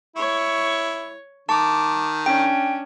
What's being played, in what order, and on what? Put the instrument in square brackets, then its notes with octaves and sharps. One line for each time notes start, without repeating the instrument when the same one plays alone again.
[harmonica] E4 [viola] C#5 C#6
[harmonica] D#3 [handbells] A5 [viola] D6
[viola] C#4 D4 [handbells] G5